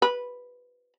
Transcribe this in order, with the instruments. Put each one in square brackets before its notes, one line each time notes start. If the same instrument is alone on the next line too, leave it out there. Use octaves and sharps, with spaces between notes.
[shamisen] B4